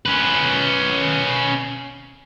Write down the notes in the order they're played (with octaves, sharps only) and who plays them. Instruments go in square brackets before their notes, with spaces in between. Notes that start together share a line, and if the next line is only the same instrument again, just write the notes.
[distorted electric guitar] C#4 B4